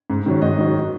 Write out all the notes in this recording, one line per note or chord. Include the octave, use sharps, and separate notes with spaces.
G#2
D#3 F#3
G#2 D#5
D#3 F#3